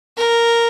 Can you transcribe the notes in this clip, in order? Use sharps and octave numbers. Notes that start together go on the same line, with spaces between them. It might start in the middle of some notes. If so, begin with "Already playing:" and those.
A#4